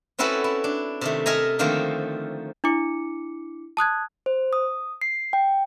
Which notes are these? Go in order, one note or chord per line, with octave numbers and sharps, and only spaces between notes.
C4 C#4 E4 F#4 A4 B4
E4
D4
C3 D#3 A3
A4 A#4 D#5 E5 G#5 A#5
D3 D#3 F3 A3 A#3 C4
D4 E4 D6 C#7
A5 D#6 F#6 G#6
C5
D#6
C7
G5